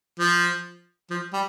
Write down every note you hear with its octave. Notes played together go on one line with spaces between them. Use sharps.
F3
F3
G3